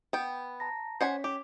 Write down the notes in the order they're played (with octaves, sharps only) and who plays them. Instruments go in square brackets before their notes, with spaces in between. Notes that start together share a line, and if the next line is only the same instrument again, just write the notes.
[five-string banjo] B3 G5
[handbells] A5 A#5 A#6
[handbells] C#4 C#5 B6 [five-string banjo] C5 F#5 G#5
[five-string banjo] G4 [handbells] D6